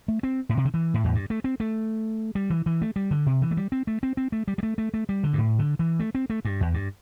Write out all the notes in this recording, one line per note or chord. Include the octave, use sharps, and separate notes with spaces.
A3
C4
A2
C3
D3
E3
A2
E2
G2
A3
C4
A3
G3
E3
E3
A3
G3
D3
C3
E3
A3
G3
C4
A3
C4
C4
A3
G3
G3
A3
A3
A3
G3
D3
G2
A2
D3
E3
A3
C4
A3
G2
E2
G2